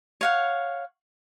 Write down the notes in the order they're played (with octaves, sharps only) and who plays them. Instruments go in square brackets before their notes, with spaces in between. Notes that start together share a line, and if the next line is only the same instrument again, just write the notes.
[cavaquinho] C#5 F5 F#5